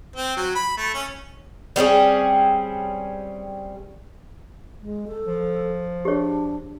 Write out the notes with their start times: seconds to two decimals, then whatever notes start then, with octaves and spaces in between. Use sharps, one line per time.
0.16 C4
0.37 F#3
0.55 B5
0.77 A3
0.94 C#4
1.76 G3 C4 C#4 G#4
4.81 G#3
5.07 A4
5.26 F3
6.05 D4 G4 G#4 C#5